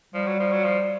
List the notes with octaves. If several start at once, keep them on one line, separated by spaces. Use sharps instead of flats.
F3 G3
F#3
F3
F#3
F3